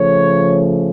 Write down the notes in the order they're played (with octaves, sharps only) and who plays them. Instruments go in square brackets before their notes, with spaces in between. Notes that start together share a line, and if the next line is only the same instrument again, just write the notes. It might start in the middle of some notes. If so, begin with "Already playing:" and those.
Already playing: [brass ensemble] C#3 F3 A3 C#5